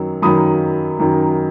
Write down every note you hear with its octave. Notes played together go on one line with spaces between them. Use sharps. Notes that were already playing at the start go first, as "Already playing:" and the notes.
Already playing: F#2 D#3 F#3
F#2 D#3 F#3 B5 D#6
F#2 D#3 F#3